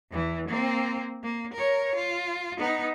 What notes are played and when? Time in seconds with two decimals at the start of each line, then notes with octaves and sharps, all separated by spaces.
0.11 E2 E3
0.48 A#3 C4
1.23 A#3
1.54 A#4 C#5
1.95 F4
2.58 B3 D#4